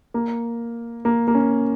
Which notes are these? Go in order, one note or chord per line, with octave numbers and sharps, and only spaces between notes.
A#3
A#3
A#3
C#4